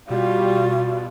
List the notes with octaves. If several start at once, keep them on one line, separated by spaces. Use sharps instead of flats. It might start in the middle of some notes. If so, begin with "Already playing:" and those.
B2 G3 F4 F#4